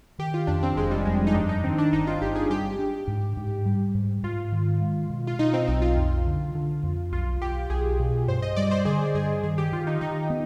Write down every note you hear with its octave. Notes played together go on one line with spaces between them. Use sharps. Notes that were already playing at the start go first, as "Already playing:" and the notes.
D#3 G4
F4
F2 D4
C4
F1 G#3
G3
F2 G#3
D#4
G2 D4
D#4
D#3 C4
D4
G1 D#4
F4
G1 G4
G#4
G3 G4
D4
G#2
G#2
G3
G#2
G#2 F4
D#3
G#3
B2
F4
B2 D#4
C4
B1 D#4
F4
F2
D3
D3
F2
B1 F4
B1 G4
B1 G#4
B2
G2 C5
D#5
G3 D5
C5
D3 G#4
G2 G#4
D#3 G#4
G4
D#3 F4
D#4
D#3 D#4
B3